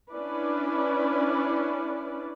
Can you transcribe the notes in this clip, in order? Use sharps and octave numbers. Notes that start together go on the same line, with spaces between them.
C#4 D4 E4 B4 D5